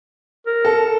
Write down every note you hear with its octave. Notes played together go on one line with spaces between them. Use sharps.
A#4
A4